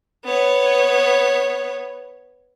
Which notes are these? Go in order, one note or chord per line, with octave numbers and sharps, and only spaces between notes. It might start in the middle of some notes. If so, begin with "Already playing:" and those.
B3 C#5